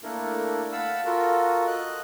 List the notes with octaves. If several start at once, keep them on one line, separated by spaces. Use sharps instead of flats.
A3 A#3 D4 E4 A4 A#4
F5 F#5 A5 B5 E6
F4 F#4 A4 A#4
D#5 F#6